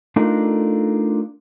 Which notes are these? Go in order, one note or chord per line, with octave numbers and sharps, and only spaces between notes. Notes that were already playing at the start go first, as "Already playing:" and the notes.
A3 D4 D#4 F4 A4 A#4